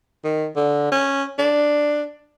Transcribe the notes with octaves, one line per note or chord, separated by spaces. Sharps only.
D#3
D3
C#4
D4